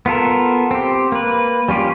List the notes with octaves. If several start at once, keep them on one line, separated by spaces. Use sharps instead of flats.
B3 F4 A4 A#4
C4 G4
A#3 B4
G3 C#4 F4 G4